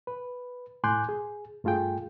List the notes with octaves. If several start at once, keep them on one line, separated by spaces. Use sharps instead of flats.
B4
A2 G#5 C6 D6 F#6 G6
G#4
G2 A3 F4 G#4 G5